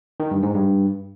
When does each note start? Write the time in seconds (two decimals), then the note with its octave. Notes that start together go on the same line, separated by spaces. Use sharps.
0.20 D#3
0.31 G2
0.43 G#2
0.54 G2